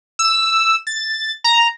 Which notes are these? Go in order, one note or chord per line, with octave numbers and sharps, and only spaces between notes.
E6
A6
A#5